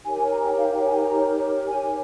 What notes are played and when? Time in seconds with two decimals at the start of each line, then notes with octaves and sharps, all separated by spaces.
0.04 D#4 G4 A#4 C#5 G#5
0.17 G#5
0.31 A#5
0.44 G5
0.58 F5
0.72 G5
0.85 G#5
0.98 A#5
1.66 G#5